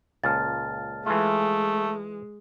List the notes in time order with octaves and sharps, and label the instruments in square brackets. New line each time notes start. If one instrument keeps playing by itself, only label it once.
[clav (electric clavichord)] C#2 A#2 [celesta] A5 F6 A6
[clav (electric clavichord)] E3 F4 [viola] G#3 [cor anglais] A3